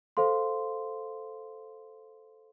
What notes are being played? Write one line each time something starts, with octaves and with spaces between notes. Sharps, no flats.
A4 C5 F5 C6